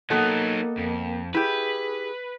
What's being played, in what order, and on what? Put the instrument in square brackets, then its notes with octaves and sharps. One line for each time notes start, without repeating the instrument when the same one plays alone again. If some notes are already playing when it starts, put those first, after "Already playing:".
[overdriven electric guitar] F#3 D#4 [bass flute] A#3 [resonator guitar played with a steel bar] B3 A4 D#5
[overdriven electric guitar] F2
[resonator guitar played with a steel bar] E4 G4 [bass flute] G#4 [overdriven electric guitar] B4